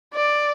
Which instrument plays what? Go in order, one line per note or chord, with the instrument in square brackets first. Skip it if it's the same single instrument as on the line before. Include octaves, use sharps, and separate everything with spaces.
[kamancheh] D5